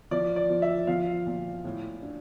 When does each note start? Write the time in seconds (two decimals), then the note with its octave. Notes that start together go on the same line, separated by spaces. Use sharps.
0.11 F3 D5
0.36 D5
0.50 F3
0.62 E5
0.87 F3 F5
1.26 A#2
1.65 A2
2.02 D4